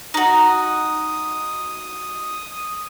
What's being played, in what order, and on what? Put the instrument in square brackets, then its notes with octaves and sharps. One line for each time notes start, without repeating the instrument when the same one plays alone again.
[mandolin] D#4 F#4 [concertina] D#6